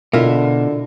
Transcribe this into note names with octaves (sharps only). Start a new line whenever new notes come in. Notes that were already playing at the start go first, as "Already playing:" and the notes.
B2 D3 E4 F4 A#4